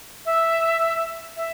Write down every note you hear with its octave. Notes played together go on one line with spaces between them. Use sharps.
E5
E5